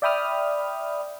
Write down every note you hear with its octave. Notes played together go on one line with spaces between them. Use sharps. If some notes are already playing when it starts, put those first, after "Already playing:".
D5 E5 G5 B5 D#6 F6